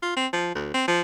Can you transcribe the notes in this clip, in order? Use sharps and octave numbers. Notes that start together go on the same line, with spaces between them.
F4
C4
F3
D2
C4
F3